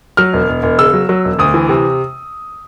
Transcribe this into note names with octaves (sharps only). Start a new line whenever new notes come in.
F#3 F6
E1
E1
E1
C#3 E6
F#3
F#3
E1
D2 D#6
E3
C3